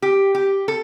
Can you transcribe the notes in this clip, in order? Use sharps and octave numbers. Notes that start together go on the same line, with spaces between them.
G4
G4
A4